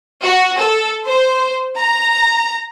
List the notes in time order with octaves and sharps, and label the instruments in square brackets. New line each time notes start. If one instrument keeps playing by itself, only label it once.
[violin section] F#4
A4
C5
A#5